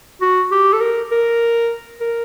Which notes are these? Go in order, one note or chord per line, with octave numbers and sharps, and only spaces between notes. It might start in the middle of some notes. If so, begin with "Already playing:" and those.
F#4
G4
A4
A#4
A#4
A#4